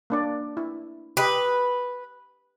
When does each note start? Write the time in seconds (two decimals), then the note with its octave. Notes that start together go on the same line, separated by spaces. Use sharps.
0.10 A#3 D4 D5
0.57 E4
1.17 G4 B4 D#5 B5